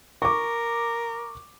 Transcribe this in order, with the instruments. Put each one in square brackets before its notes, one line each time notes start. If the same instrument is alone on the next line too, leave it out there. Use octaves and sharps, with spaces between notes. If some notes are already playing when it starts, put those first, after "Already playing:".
[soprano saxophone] A#4 [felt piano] C#6 D6